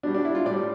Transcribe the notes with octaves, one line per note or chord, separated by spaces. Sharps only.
B2 G3 D4
D4
E4
F4
A2 G3 D5